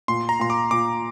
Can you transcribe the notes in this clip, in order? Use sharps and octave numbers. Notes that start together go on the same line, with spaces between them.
A#2 C6
A#5
A#2 C6
D6
A#2 D6